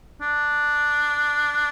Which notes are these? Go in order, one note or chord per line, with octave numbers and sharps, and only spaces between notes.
D4